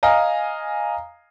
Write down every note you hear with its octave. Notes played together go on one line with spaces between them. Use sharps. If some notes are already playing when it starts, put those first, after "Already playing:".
D#5 F5 G#5 A#5